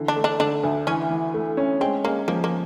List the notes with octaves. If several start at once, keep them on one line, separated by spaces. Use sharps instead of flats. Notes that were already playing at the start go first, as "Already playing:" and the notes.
Already playing: D3 E3
D4
A3
D4
D3 D4
D2
E3 C#4
E3
A3
C#4
G#3 C4
G#3 A#3
F3 A#3
A#3